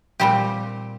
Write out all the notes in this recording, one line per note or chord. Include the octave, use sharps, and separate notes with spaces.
A#2 G3 C4 G4